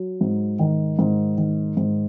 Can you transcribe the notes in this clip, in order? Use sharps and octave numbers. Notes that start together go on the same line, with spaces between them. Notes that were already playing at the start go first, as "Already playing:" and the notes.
Already playing: F#3
G#2
D#3
G#2
D#3
G#2